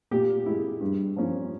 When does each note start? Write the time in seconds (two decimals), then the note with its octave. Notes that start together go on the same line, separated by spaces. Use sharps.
0.11 A#2 G4
0.46 G#3 E4
0.80 G2
1.16 F3 A#3 C#4 F4